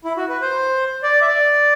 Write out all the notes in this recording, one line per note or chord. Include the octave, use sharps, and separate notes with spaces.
E4
F#4
B4
C5
D5
E5
D5